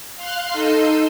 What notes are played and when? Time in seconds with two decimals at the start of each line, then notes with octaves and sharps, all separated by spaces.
0.17 F5 C6 F6 F#6
0.51 D#4 A4 D#5 C6 E6 G6